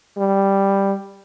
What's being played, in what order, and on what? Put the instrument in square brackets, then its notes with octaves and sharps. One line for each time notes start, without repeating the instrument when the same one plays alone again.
[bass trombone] G3